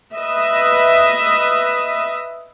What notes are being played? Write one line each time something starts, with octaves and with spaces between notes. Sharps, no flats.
B4 D#5 E5